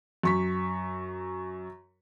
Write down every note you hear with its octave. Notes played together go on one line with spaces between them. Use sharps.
F#2 C#6 B6